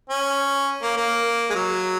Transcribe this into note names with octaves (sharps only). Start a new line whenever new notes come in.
C#4
A#3
A#3
G#3
F#3